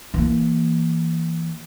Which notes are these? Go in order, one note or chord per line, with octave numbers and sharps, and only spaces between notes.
E3 A#3